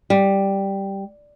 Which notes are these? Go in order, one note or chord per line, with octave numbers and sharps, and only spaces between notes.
G3